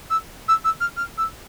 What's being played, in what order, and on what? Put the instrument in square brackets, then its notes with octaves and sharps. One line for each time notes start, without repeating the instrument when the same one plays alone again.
[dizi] E6
E6
E6
F6
F6
E6